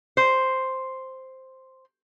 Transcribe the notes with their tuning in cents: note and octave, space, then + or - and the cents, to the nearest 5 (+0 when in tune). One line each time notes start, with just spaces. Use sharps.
C5 +0